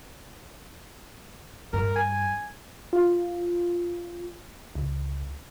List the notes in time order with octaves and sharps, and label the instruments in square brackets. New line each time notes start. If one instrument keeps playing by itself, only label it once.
[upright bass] G2 [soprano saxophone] A#4
[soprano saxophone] G#5
[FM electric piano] F4
C#2